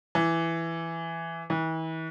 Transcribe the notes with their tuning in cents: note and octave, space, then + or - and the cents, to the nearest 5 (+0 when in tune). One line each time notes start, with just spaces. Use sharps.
E3 +5
E3 -40